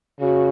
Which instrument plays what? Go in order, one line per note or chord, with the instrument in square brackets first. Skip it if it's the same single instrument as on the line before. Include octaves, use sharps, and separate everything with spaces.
[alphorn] C#3 [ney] F#4